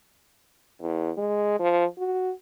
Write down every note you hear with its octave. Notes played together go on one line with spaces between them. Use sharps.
E2
G#3
F3
F#4